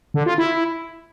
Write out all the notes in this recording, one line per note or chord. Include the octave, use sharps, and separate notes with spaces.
D3
F4
E4